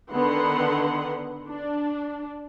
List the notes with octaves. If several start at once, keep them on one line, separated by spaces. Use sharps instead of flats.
D3 D#3 B3 B4 F#5 C6
D4